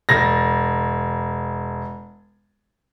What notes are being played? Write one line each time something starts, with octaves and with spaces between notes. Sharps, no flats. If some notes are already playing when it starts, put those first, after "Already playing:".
E1 A6 A#6